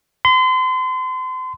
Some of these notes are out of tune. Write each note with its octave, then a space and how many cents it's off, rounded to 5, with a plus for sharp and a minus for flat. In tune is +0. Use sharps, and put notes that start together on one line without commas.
C6 -35